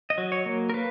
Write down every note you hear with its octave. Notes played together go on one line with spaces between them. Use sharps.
D#5
F#3
C#5
A#3
A#4
A#3 B4